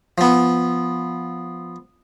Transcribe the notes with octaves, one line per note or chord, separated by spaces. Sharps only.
F3 B3